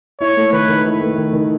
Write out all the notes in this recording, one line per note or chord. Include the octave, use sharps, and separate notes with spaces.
E4 C#5
A3
D#3 B4
D#3
E4
A3
D#3
D#3